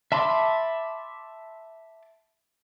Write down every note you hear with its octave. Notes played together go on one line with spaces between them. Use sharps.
E5 A5 B5 C6 D6